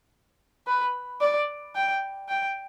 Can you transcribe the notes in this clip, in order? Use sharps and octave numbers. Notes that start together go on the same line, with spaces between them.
B4
D5
G5
G5